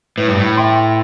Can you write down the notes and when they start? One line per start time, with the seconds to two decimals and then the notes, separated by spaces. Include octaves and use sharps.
0.18 A2 B4
0.28 G2
0.38 A2
0.57 E5 G5 C6